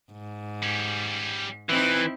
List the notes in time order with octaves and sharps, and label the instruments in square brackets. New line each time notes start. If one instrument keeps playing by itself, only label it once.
[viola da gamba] G#2
[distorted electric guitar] G3 C#4
[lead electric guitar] E3 [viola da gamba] C4 D#4 E4 [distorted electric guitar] C5 B5